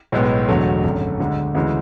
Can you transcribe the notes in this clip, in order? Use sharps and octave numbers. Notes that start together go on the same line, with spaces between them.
B1 A2 G#3 B3
E1 E2 D3 F#3 A3
G#1 F#2 D3 A3
D2 D3 G#3
D2 C#3 E3 G#3